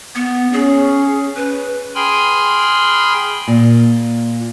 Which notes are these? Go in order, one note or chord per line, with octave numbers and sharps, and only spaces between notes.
B3
C#4 G#4
B4
G#4 G5 G#5 B5 C6 F6
A#2